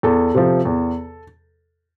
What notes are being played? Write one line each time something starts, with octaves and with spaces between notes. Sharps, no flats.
E2 A4
C3 F3
E2